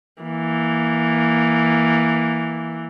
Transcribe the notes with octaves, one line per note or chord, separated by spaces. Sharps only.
E3 A#3